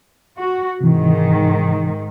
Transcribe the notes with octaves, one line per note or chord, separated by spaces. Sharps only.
F#4
G#2 C3 D#3 E3